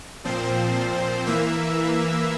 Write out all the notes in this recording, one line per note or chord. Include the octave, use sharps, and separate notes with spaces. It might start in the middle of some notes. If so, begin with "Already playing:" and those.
A#2 F3 C4 C5
E3 A#3 E5